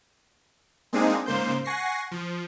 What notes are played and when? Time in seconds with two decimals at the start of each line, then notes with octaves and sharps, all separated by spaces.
0.93 G#3 A#3 C4 D4 D#4 G#4
1.26 G#2 C#3 A#3 C5 G6
1.64 F#5 G#5 C#6 A#6 C7
2.11 F3